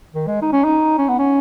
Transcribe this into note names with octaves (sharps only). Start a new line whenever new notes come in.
D#3
G#3
D#4
C#4
D#4
C#4
B3
C#4